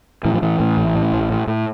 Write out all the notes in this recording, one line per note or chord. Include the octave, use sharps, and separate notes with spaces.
A2 E3
F3
A2 E3
A2
A1
A2
A1
A2
A2